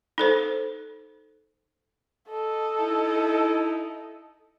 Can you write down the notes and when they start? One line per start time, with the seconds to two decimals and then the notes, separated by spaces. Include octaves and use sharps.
0.18 D#4 A4 C5
2.29 A4 D#5
2.80 D#4 E4